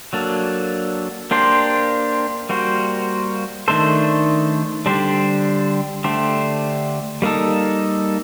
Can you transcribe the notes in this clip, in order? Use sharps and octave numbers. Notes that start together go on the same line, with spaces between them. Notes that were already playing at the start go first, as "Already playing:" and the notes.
F#3 A#3 D4 A4
A#3 D4 G4 C5
G3 A#3 F#4 C5
D#3 A3 D4 A4 C5
D3 G3 D4 G4 C5
D3 A3 D4 G4 C5
G3 A#3 D#4 A4